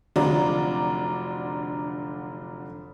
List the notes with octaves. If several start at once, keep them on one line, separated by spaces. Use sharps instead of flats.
F1 D3 F#3 F4 D5 A#5